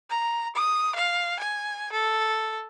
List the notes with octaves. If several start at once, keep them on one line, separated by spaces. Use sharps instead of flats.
A#5
D#6
F5
G#5
A4